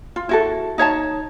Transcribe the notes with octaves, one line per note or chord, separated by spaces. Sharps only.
F4
E4 F#4 A4
D#4 C#5 E5 A5